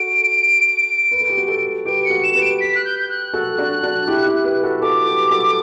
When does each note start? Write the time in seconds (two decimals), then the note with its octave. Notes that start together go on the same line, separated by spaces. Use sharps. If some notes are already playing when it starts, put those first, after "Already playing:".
Already playing: F#4 A4 D7
1.11 B4
1.20 A4
1.30 G4
1.38 F#4 A4
1.48 F#4 A4
1.85 G4 B4 D7
2.05 C#7
2.10 F#4 A4
2.23 E7
2.35 G4 B4
2.41 D7
2.60 B6
2.75 F#6
2.85 G6
3.00 G6
3.09 F#6
3.34 F#4 A4
3.58 D4 F#4
3.83 D4 F#4
4.07 E4 G4
4.26 E4 G4
4.44 G4 B4
4.63 F#4 A4
4.81 F#4 A4 D6
5.06 G4 B4
5.31 F#4 A4